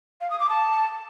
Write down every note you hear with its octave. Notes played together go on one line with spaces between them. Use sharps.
F5
D#6
D6
A5